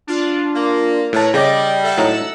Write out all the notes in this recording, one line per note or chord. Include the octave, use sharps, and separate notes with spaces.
D4 F4
A#3
A2 A#4 B4 C#5 A5
C#3 G3 D5 D#5 D6 A#6
A4 E5 F#5 E6
A2 F#3 D#4